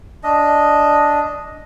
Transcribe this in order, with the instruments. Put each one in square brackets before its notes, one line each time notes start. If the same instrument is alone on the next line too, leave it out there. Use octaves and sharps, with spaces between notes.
[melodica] D4 D#5